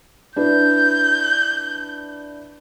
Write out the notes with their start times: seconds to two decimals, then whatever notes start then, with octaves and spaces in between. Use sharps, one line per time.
0.36 D4 E4 B4 G6